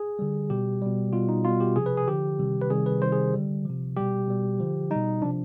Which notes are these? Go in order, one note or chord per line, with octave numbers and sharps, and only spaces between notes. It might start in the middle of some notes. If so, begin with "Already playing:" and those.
Already playing: G#4
D3 G3
B2 G3 G4
B2 G3
B2 G3 F4
D#4
B2 G3 F4
G4
C3 F3 G#4
B4
G#4
D3 F3 G4
C3 D#3 G3
B4
C3 D#3 G3 G#4
B4
C3 D#3 G3 C5
G#4
D3 G3
C3 F3
B2 G3 G4
B2 G3
D3 F3
B2 G3 D#4
C3 F3 D4